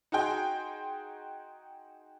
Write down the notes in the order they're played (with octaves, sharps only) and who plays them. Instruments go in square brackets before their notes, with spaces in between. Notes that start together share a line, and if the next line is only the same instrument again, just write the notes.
[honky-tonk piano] D#4 F#4 G#4 G5 C6